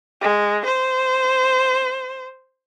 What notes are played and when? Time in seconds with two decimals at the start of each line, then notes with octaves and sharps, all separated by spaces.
0.21 G#3
0.65 C5